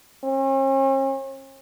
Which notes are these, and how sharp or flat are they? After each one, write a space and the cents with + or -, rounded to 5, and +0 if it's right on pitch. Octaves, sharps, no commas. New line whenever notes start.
C#4 -45